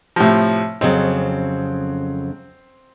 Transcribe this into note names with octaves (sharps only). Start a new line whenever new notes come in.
A2 C3 F3
F2 C#3 F#3 C4